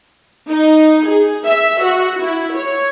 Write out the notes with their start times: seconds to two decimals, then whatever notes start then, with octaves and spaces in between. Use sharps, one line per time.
0.50 D#4
1.08 G#4
1.47 E5
1.85 F#4
2.23 E4
2.57 C#5